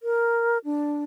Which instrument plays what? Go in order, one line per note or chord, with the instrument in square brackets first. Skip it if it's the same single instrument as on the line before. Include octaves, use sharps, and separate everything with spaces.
[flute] A#4
D4